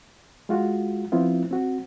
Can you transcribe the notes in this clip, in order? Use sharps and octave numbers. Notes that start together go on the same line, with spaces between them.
G#3 F4 F#4
F3 B3 C4 E4 F4
C4 F#4